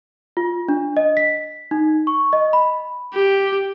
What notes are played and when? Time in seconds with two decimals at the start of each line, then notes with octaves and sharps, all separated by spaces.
0.37 F4
0.69 D4
0.97 D#5
1.17 B6
1.71 D#4
2.07 C#6
2.33 D#5
2.53 B5
3.14 G4